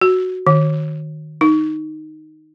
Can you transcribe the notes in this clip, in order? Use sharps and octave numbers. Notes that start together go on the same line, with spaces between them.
F#4
D#3
D#4